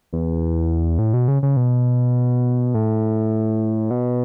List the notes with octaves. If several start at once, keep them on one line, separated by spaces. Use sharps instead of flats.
E2
A2
B2
C#3
C#3
B2
A2
B2